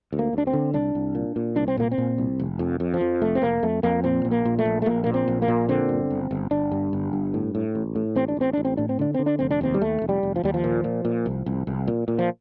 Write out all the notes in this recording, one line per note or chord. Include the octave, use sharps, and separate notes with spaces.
D2
A#3
D2 D4
C4
D3
C2 D4
C2
A#2
A#2
C2 D4
C4
A#2 A#3
C4
A#2
C2
F1
F2
F2
F3
F2
F1 A3
C4
F1 A#3
F2 A3
F2 A#3
A#2 C4
A#1
A#3
A#2
A3
A#1
A3
A#1 A#3
A#2 A#3
C4
A#1
A#3
A#2
D3 C4
G1
G1
G1
G1 D4
G2
G1
G2
A2
A2
A1
A2
A1 C4
D4
A1 C4
A1 D4
C4
A2 D4
C4
D3 D4
D3 C4
D4
F1 C4
D4
D#2 C4
G3
D#2 A3
F1
G3
F1
F3
D#2 G3
F3
A#2
A#2
A#2
C2
C2
C2
A#2
A#2
F3